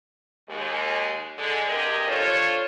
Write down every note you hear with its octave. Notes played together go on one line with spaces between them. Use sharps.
D#2 G#3
D3 G#3
G2 C3 G4 G#4 A#4 D#5
D4 F4 A4 C5 C#5